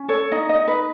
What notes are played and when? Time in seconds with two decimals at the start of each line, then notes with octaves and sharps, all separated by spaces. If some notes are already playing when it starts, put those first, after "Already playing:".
Already playing: C#4
0.08 A4 C#5
0.32 D#4 D#5
0.49 D#5
0.55 D#4
0.68 B4